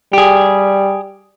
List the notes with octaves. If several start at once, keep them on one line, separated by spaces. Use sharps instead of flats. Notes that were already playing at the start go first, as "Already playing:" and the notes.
G3 G4 G#4